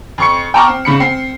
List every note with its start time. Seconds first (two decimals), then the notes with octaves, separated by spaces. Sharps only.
0.18 F2 C#6 C#7
0.54 G5 A5 A#5 C#6 D6 F6
0.68 C4
0.85 G#2 C#3 B5 C#7
1.00 C4 C7